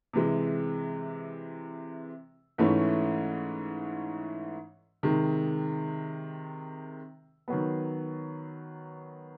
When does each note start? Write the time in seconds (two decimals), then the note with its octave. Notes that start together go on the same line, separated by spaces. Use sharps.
0.13 C3 E3 G#3
2.58 G#2 E3 A3 C#4 E4
5.03 C3 D#3 G#3
7.48 D#3 F#3 B3